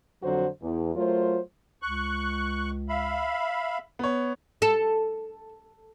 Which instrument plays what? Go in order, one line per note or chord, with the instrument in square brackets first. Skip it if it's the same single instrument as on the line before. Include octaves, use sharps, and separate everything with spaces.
[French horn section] F2 D3 F#3 F#4 C5
E2
F#3 A3 F4 A#4 C5
[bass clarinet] C#2 [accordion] C#6 F#6
[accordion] E5 F5 B5
[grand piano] B3 C#5
[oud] A4